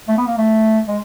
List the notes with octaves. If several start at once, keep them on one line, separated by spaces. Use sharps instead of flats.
A3
B3
A#3
A3
G#3